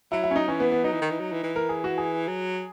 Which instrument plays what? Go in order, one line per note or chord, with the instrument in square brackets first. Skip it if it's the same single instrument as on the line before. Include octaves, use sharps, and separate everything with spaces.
[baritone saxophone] F#3 [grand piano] E4
[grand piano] E4
C#4
D#4
[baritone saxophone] E3 [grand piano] C#4
[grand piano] B3
B3
[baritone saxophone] F#3 [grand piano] D#4
[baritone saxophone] E3
D#3
E3
F#3
E3
E3
[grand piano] A#4
G#4
F#4
G#4
[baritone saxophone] F#3